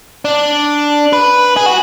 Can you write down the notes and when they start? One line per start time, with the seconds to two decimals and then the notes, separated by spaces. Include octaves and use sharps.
0.25 D4
1.13 B4
1.57 G#4
1.66 F#4